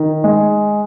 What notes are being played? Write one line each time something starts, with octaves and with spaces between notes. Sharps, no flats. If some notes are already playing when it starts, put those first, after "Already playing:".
Already playing: D#3
G#3